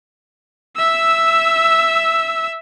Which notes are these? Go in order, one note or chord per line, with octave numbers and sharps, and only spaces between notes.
E5 E6